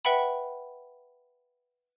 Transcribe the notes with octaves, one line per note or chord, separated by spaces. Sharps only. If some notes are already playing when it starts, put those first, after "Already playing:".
B4 E5 F#5 G5 B5